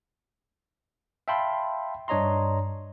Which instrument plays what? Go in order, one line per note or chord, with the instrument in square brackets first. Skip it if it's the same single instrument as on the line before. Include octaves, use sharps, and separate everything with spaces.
[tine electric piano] E5 F5 G5 A5 B5 C6
G2 D4 C#5 D#5 A#5 C6